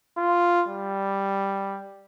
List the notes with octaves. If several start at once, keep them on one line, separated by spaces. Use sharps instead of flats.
F4
G3